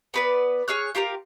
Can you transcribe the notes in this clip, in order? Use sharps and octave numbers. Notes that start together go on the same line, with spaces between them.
B3 B4 D5
G#4 C#5 F6 F#6
F4 G4 A#4 F5